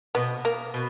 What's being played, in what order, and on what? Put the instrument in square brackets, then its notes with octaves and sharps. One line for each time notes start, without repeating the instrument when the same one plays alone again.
[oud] B2 [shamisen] B3
[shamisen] A#3
[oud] B2